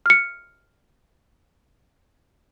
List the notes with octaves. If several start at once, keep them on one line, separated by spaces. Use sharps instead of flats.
F6 C#7